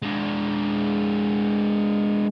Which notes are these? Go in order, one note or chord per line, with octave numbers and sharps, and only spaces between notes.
G#3 D4